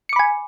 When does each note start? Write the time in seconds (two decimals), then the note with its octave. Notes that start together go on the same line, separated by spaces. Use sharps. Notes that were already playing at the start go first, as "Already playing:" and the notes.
0.09 C#7
0.13 D6
0.16 B5
0.19 G#5